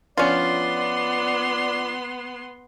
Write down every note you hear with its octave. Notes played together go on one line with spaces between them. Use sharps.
F3 B3 C#4 D4 F4 D5 C6